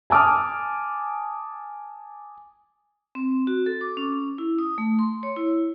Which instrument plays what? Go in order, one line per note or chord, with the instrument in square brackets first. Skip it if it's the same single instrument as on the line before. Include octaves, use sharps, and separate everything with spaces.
[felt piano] G#5 A5 D6 D#6 F6
[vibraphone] C4
F#4
A4
D6
C#4
E4
D#6
A3
C6
C#5
E4